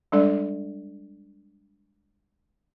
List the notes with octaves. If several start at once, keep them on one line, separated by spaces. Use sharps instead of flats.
G3 G#3 D4 A4 D5